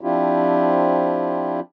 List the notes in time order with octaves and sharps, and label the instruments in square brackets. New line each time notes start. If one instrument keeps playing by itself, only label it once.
[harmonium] F3 C4 D4 E4 F4 G4